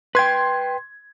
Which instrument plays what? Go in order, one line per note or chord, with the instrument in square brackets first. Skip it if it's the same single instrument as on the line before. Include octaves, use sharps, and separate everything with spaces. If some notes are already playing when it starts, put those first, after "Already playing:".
[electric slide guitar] B4 G5 [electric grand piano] C6 G#6